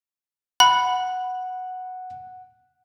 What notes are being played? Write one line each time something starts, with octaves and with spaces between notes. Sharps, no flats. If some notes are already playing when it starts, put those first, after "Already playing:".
F#5 B5